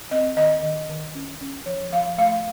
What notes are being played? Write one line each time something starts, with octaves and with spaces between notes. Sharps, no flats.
C4 D#5
D#3 D#5
D#3
D#3
C#4
C#4
F3 C#5
F3 F5
A3 F5